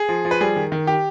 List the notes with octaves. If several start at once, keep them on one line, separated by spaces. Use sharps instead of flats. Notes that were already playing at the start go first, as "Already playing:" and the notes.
Already playing: G#4
F3
F3
B4
G3 G#4
D#3
D#3
G4